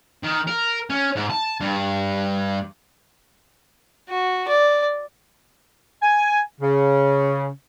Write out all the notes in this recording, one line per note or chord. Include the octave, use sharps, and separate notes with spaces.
D#3
A#4
C#4
G#2
A5
G2
F#4
D5
G#5
C#3